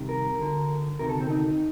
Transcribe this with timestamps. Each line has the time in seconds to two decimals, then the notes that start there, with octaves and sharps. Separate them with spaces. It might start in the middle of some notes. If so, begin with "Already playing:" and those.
Already playing: C2 C3 D#3
0.09 A#4
0.39 D2 D3
0.99 D2 C3 D#3 A#4
1.09 A4
1.20 C4
1.30 D#4